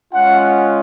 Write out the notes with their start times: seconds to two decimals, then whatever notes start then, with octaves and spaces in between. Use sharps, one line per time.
0.12 G#3 C#4 F4 F#5
0.40 F#5